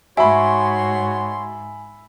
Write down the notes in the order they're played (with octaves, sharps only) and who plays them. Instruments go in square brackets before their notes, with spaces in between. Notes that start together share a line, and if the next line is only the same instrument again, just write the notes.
[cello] G#2 [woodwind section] F#4 C#5 C6 [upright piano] E5 B5 [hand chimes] G#5